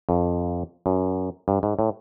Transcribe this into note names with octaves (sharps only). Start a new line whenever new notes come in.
F2
F#2
G2
G#2
A2